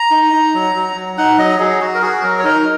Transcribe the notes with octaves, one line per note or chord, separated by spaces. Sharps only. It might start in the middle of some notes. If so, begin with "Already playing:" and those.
Already playing: A#5
D#4
D#4
F#3
F#3
F#3
D#4 F#5
F#3 D#5
F#3 G#4
F#4
A#4
F#4 G#4
F#3 A#4
C#5
D#4 A#4